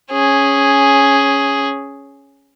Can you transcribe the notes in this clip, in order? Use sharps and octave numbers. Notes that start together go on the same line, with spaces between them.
C#4 G#4